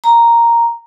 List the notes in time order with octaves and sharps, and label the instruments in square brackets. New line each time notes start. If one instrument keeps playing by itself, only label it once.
[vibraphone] A#5